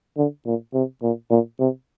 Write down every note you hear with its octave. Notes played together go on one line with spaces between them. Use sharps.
D3
A#2
C3
A#2
A#2
C3